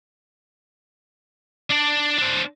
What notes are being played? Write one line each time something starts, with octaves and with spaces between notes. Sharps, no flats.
D4 D5
C4 D4